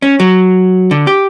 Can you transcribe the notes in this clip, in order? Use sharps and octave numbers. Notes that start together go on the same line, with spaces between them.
C#4
F#3
D3
G4